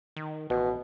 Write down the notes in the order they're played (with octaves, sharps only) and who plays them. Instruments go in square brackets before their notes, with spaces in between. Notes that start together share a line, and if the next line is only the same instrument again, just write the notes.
[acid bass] D#3
[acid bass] A1 [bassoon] B2